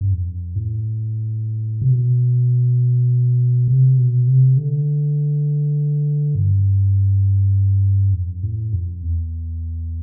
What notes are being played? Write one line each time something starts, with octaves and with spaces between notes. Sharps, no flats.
G2
F2
A2
C3
B2
C3
B2
C3
D3
G2
F2
A2
F2
E2